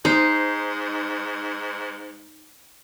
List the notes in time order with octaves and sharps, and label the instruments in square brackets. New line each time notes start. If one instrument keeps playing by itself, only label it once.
[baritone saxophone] G#2 [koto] D#4 [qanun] C5